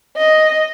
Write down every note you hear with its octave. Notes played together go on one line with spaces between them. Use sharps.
D#5